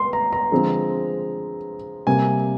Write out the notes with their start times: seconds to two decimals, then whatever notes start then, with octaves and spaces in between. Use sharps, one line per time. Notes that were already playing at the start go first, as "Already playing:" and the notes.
Already playing: C6
0.13 A#5
0.33 A#5
0.52 D3 F3 G#3 C4
2.07 C3 G3 A#3 G#5